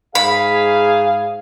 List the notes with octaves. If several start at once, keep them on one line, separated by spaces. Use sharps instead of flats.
G#2 G#4 F5 B5